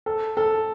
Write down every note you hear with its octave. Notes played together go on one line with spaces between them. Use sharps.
A4
A4